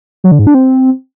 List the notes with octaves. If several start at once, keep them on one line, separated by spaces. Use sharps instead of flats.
F#3
D3
G#2
D4
C4